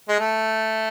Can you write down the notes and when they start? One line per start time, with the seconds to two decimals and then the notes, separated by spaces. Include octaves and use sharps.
0.08 G#3
0.19 A3